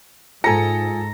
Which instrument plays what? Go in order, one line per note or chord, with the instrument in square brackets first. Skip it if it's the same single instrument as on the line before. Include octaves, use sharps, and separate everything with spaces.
[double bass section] G#2 [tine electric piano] F4 G#5 [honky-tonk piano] A4 C#7 [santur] A#5